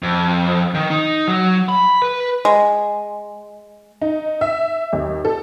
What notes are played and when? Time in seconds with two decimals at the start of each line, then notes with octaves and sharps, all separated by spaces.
0.03 F2
0.74 D#3
0.90 D#4
1.28 F#3
1.69 B5
2.02 B4
2.45 G#3
4.02 D#4
4.41 E5
4.93 D#2
5.25 A4